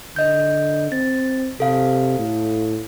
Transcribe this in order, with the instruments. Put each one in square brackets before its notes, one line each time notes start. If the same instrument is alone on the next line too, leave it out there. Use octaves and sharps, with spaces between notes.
[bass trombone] D3 [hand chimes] D#5 G6
[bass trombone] C4 [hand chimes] A6
[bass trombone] C3 [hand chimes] A4 F5
[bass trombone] A2